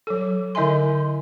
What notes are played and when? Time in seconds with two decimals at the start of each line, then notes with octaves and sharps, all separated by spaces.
0.07 F#3 A4
0.55 D3 E4 D#5 E5 G#5 C6